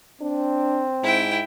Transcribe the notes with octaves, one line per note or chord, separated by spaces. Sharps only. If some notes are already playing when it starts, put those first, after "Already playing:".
C4 D4
G#2 E4 G5